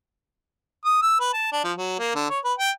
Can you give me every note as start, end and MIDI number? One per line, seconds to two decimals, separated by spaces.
0.85 1.00 87
1.03 1.17 88
1.20 1.33 71
1.34 1.51 81
1.52 1.60 62
1.64 1.72 53
1.78 1.99 54
1.99 2.13 58
2.15 2.28 50
2.30 2.39 73
2.45 2.53 71
2.59 2.71 79